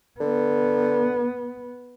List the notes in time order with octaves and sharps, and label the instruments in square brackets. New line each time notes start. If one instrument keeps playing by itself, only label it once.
[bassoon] D3 [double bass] B3